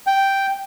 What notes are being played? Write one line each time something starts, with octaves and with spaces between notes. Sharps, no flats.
G5